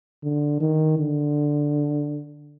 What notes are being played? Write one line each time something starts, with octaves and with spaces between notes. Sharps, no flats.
D3
D#3
D3